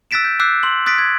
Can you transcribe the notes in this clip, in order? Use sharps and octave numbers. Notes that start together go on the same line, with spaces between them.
E6 F#6 A6 B6 D7 E7
G6
D6 E6 F#6 G6 C7
C6 F#7
D#6 F#6 A6 B6 D7
G#6